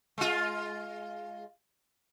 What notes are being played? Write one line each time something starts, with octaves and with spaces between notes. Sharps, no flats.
G#3 F4